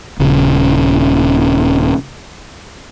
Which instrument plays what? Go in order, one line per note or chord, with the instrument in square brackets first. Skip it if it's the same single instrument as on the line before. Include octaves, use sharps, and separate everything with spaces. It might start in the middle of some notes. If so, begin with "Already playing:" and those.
[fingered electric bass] D#1 C#3